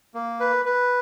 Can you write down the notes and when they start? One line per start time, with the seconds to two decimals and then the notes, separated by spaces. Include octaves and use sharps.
0.14 A#3
0.40 B4
0.65 B4